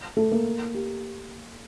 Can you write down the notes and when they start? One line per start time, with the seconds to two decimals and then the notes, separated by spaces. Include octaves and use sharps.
0.17 A3 A4
0.31 A#3 A#4
0.74 G4